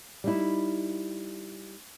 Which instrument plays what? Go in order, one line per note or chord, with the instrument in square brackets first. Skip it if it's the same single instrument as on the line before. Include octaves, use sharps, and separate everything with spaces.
[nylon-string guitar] G3 D#4 E4